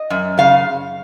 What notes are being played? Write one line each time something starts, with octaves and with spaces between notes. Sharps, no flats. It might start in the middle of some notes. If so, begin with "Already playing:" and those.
Already playing: D#5
F#2
C#3 F5